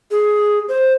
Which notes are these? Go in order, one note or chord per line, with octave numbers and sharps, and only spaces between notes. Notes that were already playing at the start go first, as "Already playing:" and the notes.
G#4
C5